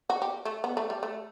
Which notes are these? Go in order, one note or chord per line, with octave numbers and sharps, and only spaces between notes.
F#4
G4
A3
B3
A3
G3
A3